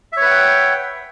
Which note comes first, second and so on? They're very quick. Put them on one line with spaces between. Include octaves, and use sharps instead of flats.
E5 C#5 B4 F#5 G5